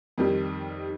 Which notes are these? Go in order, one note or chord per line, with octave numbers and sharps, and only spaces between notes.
F2 D#3 G3